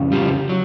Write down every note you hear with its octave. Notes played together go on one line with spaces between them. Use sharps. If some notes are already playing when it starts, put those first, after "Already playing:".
Already playing: F2 C#3
F3 G3
F#3